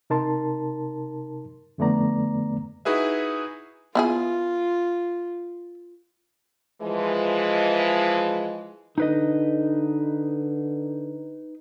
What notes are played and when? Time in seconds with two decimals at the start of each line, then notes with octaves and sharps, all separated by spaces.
0.10 C3 D#4 A#4 A5 C6
1.78 F2 D3 A3 B3 D5 A#5
2.85 D#4 E4 F#4 G#4 B4 E5
3.95 B3 E4 F4 G#4
6.82 E3 F3 G#3
8.98 D3 D#4 B4 D#5